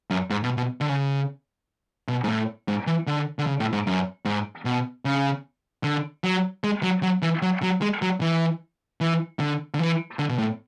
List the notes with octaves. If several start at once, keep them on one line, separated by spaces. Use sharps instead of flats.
F#2
G#2
B2
B2
D3
C#3
B2
G#2
A2
G#2
E3
D3
D3
C#3
A2
G#2
F#2
G#2
B2
C#3
D3
F#3
G#3
F#3
F#3
E3
F#3
F#3
G#3
F#3
E3
E3
D3
D3
E3
D3
B2
A2